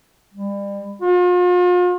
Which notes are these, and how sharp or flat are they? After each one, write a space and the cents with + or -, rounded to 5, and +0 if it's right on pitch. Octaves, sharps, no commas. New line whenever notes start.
G3 +35
F4 +40